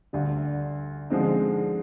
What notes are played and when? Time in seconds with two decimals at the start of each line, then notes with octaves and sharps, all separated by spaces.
0.13 D2 D3 G3
1.10 D3 F3 G#3 C4 D#4